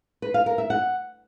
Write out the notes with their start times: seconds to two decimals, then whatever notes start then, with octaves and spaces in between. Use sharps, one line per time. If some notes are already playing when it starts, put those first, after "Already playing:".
0.22 B4
0.34 F5
0.46 A#4
0.58 E5
0.70 F#5